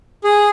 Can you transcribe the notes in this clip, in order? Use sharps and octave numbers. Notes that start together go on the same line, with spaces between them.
G#4